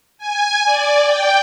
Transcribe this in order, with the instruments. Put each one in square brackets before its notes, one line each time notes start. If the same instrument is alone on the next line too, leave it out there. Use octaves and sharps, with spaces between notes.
[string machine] G#5
D5
G5